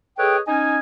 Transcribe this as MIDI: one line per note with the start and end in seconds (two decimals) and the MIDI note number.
0.19 0.38 68
0.19 0.38 69
0.19 0.38 71
0.19 0.38 73
0.19 0.38 75
0.19 0.38 79
0.48 0.79 61
0.48 0.79 63
0.48 0.79 75
0.48 0.79 80